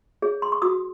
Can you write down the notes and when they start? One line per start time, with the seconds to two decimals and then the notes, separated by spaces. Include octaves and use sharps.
0.22 G#4 C#5
0.42 C6
0.52 C#6
0.62 F#4 D#6